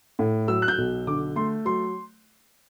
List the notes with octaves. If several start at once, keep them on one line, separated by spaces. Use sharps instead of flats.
A2
F#3 E6
F#6
G6
B1
D3 D6
A3 C6
F#3 C6